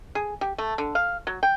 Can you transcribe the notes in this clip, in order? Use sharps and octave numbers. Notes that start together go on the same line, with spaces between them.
G#4
G4
A3
D3
F5
F#3
G5